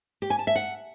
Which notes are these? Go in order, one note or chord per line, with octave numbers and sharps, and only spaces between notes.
G4
G#5
A5
E5
F#5